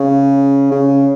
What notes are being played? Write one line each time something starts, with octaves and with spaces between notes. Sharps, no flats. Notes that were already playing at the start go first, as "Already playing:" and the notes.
Already playing: C#3
C#3